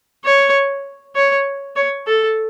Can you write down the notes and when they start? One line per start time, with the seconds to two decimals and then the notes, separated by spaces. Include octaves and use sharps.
0.25 C#5
1.16 C#5
1.76 C#5
2.07 A4